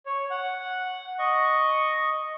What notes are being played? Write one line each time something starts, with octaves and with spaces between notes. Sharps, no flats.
C#5
F#5
D#5 C#6